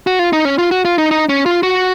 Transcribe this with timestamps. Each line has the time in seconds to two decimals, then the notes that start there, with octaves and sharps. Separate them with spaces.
0.07 F#4
0.19 F4
0.33 D#4
0.45 C#4
0.59 F4
0.71 F#4
0.85 F4
0.98 D#4
1.11 D#4
1.29 C#4
1.46 F4
1.63 F#4